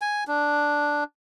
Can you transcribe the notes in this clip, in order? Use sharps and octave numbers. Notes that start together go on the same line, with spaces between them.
G#5
D4